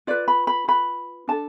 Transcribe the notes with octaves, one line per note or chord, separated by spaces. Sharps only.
F4 B4 D5
B5
B5
F4 B4 B5
D4 A4 A5